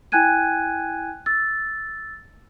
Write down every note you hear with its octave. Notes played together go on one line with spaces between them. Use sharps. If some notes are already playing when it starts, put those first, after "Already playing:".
E4 G5 G#5 F#6 G#6 D#7
E6 A6